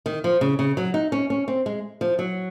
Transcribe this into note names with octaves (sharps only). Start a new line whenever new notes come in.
D#3
F3
C#3
C#3
F#3
D#4
C#4
C#4
C4
G#3
F3
F#3